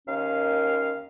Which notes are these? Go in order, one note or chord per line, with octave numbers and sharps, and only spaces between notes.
D#2 D#3 C#4 F5